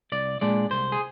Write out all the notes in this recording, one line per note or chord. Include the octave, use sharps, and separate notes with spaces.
C2 D5
A#2 G#3 D4 D5
C2 C5
G#4